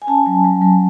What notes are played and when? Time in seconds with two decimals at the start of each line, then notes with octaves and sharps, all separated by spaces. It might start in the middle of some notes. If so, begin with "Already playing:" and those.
0.02 G#5
0.07 C#4 A5
0.26 F#3
0.44 F#3
0.62 F#3